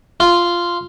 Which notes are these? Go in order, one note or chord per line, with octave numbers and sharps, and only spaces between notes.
F4